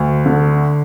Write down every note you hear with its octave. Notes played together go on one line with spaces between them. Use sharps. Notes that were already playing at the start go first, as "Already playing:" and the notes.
Already playing: D2
D3